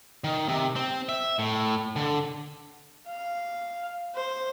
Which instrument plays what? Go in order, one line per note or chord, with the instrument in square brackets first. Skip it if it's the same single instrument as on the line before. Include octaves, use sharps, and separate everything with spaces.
[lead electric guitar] D#3
C3
C4
E5
A2
D3
[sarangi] F5
C5